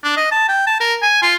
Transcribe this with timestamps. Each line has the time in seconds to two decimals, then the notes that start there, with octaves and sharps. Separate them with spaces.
0.04 D4
0.17 D#5
0.31 A5
0.49 G5
0.67 A5
0.80 A#4
1.02 G#5
1.23 F4